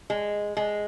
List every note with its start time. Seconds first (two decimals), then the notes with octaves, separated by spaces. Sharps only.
0.10 G#3
0.57 G#3